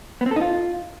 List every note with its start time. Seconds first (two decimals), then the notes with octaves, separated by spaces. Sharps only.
0.21 B3
0.26 C4
0.31 A4
0.36 D#4
0.41 F4